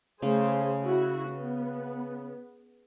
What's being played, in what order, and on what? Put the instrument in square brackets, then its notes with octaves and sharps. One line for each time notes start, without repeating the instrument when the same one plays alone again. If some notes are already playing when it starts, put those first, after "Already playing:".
[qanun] C#3 [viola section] A3 G#4 C5
[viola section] E4 F#4
B3